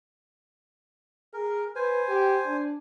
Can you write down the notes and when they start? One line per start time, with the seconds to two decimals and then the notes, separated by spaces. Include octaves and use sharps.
1.34 G#4 A#4
1.76 B4 C5 G#5
2.08 G4
2.45 D4